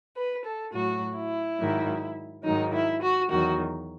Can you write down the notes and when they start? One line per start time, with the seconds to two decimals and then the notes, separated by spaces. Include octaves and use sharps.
0.16 B4
0.45 A4
0.72 A2 F#3 F#4
1.15 E4
1.59 G#2 D#3 F#3
2.44 G#2 D#3 F#3 D#4
2.73 E4
3.02 F#4
3.30 E2 D#3 F#3 F#4